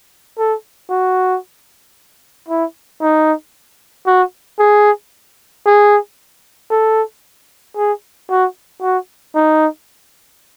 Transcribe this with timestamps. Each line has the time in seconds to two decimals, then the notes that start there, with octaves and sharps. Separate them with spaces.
0.38 A4
0.90 F#4
2.48 E4
3.01 D#4
4.07 F#4
4.59 G#4
5.66 G#4
6.70 A4
7.76 G#4
8.30 F#4
8.82 F#4
9.35 D#4